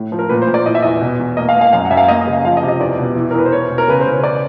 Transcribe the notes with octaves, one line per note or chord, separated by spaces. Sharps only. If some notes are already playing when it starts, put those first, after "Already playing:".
Already playing: A2
F3
A#4
A#2 B4
C5
A#2
D5
E3 D#5
E5
E2 D#5
B2
E2
A#3 D#5
F5
A#3
F5
F#2 F5
F#5
F#2 E5
F5
A#3 D#5
D#5
C#3
F5
F3 F5
D#5
C3
D#5
E2 D5
B2
E3
A#4
E2 B4
C5
E2 C#5
B2
A#4
C#3 B4
C5
C#3
C#5
D5